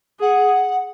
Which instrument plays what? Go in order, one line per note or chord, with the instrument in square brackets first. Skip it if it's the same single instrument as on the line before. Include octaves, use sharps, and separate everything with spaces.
[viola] G#4 [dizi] F#5